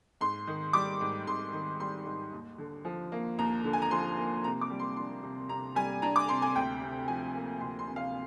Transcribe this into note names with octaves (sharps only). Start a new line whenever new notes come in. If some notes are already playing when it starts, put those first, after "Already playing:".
G#2 C6
D#3
G3 D6
G#2
G#2 C6
D#3
G3 C6
G#2
D#2
D3
F3
A#3
D#2 A#5
D3
G#5
A#5
F3 C6
A#3
C3 A#5
D6
G3
C6
D4 C6
C3
C3 A#5
G3 G#5
D4 A#5
D6
C3 C6
G#5
D2 G5
C3
F3 G#5
A#3
D2 C6
C6
C3
F5